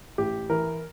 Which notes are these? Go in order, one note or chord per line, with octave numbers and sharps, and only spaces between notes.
A1 G4
E3 A#4